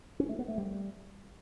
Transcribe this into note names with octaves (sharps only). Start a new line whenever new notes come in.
C#4
A3
B3
A3
G3